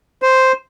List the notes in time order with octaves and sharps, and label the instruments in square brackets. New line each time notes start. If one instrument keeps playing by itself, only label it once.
[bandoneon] C5